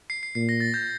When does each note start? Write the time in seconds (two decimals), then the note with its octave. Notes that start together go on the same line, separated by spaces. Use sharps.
0.10 C7
0.23 C7
0.35 A#2 C7
0.49 A#6
0.60 A6
0.74 G6